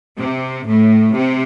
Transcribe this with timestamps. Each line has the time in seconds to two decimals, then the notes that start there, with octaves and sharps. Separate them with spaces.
0.18 C3
0.66 A2
1.15 C3